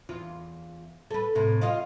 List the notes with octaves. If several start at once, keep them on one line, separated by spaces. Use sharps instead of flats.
E2 F4
A4 B4
A2 C3
F4 D#5 F5